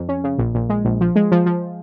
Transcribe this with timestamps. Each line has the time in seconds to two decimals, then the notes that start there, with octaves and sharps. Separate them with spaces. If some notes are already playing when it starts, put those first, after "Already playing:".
Already playing: F2
0.09 C#4
0.24 C#3
0.38 A#1
0.55 A#1
0.70 G#3
0.85 A#1
1.01 F3
1.16 G#3
1.32 F3
1.46 F3